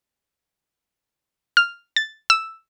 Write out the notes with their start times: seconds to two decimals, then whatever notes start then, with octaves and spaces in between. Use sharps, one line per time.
1.57 F6
1.96 A6
2.30 E6